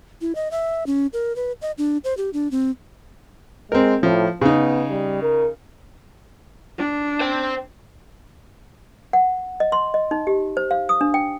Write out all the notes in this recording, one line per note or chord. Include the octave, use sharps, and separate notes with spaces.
E4
D#5
E5
C#4
A#4
B4
D#5
D4
C5
G4
D4
C4
G#3 C4 A#4
A2 F3
C#3 B3 D#4
G3
A#4
D4
C5 G5
F#5
D#5
C6
D#5
D#4
G4
C5
F5
D#6
D4
G5